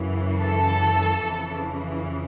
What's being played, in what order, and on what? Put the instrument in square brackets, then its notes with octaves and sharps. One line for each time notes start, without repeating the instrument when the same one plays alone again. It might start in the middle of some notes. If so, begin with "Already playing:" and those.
Already playing: [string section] F#2 C#3 E3
A4
F2 C#3 E3